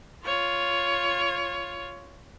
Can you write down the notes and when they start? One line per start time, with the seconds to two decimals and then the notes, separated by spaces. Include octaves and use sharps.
0.24 F4 C#5